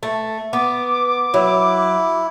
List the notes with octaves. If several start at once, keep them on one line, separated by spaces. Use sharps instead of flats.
A3
B3 D6
F#3 E4